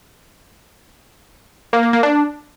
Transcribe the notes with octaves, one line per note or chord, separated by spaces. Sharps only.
A#3
A#3
A#3
D4